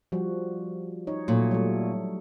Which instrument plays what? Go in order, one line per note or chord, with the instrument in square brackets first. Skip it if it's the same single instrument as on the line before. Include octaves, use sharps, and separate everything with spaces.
[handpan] F3 G3 F#4
D#4 C#5
[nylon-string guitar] A#2 [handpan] F#3 A3 C#5
[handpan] F#3 G3 A3